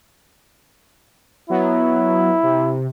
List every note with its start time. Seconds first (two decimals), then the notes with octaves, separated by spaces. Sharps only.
1.50 F#3 B3 E4
2.43 C3